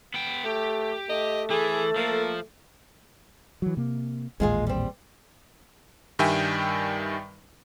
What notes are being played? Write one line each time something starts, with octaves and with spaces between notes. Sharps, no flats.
B3 G5
A3 G4
A3 D#5
E3 G#4 A4
F3 A#3
E3 F#3
C3 A#3
A1 D#2 A#2 G#3 F4 G#4
G3 C4
G2 D#3 G3 E5 G5 G#5